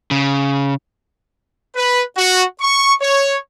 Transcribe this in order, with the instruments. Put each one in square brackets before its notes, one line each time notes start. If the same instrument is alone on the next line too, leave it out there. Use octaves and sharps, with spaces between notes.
[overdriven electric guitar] C#3
[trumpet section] B4
F#4
C#6
C#5